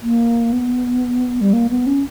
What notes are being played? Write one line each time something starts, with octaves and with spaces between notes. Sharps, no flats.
A#3
B3
G3
A#3
B3
C#4